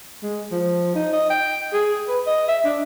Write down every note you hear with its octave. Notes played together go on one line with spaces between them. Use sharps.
G#3
F3
D#4
D#5
G5
G#4
B4
D#5
E5
D4